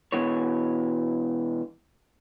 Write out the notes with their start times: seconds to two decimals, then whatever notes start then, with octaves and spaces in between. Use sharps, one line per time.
0.12 B2 E3 C#5